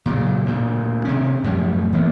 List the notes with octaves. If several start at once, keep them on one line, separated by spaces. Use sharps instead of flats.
A#2 C#3 F3 F#3
D2 A#2
C3 D#3 C#4
F#2 A2 F3 G3
E3 A#3 B3